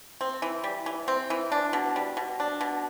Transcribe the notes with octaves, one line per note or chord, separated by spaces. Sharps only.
C4
E3
G3
E3
C4
E3
D4
B2
G3
B2
D4
B2